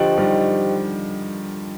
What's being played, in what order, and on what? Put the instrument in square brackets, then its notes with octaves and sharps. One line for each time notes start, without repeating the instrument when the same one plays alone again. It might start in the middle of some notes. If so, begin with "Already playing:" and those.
Already playing: [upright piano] D3 F3 [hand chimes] G4 C5 D#5 G5
[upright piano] D#3 G3